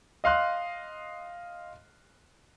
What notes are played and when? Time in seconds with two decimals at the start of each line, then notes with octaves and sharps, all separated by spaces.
0.24 D#5 F5 C6 F#6